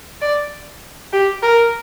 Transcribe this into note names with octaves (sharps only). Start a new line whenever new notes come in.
D5
G4
A#4